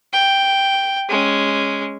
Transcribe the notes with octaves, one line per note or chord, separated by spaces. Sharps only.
G5
G#3 C#4